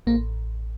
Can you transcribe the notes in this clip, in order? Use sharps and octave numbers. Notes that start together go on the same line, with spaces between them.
A1 A#3